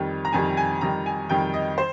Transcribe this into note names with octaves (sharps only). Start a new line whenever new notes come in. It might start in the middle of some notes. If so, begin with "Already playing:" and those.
Already playing: F2 D#3 G3
A#5
F2 D#3 G3 G#5
G#5
F2 D#3 G3 A#5
G#5
F2 D#3 G3 G5
D#5
C5